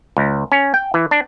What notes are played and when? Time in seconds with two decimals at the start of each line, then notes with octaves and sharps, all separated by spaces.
0.17 C#2
0.52 C#4
0.74 G5
0.94 E3
1.11 D4